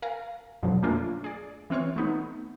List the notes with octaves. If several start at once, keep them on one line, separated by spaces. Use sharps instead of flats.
A#4 F5 G#5 A#5
F2 B2 D3 F#3
A3 A#3 C#4 D4 F4 A#4
G#4 D5
E3 C4 F4 C#5 C#6
A3 B3 D#4